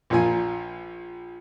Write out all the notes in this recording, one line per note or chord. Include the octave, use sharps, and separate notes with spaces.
A#1 A#2 F3 G#5